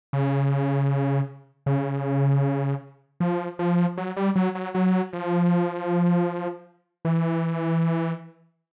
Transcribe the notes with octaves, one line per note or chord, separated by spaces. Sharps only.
C#3
C#3
F3
F3
F#3
G3
F#3
F#3
F#3
F3
E3